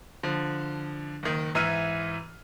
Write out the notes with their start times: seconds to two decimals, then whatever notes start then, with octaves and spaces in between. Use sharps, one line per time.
0.23 D3 F3
1.23 F#1 D#3
1.55 G#2 E3 E4 E5 F6 D#7